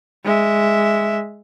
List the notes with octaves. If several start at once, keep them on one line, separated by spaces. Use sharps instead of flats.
G#3 E5